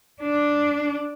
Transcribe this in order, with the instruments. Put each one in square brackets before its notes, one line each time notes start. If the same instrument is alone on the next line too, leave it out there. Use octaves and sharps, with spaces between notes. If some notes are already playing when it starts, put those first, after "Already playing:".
[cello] D4